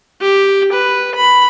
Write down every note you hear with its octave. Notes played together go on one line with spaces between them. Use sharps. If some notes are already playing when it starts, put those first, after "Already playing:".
G4
B4
B5